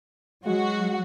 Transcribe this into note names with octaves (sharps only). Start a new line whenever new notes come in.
F#3 G#3 F#4